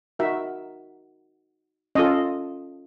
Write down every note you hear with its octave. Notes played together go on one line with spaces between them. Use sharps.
D#4 F#4 A#4 E5
C#4 F4 A4 D#5